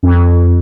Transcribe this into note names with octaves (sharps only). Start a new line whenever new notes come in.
F2